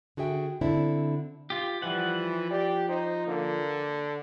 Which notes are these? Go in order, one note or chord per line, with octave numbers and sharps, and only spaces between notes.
D3 F#4 G#4 E5 G5
D3 C4 D4 E4
F4 G4
E3 F3 G3 F#5
G4 D5
D#4 C5
D3 A#3